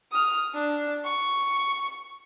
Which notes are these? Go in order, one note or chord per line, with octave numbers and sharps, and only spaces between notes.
D#6 F6
D4
C#6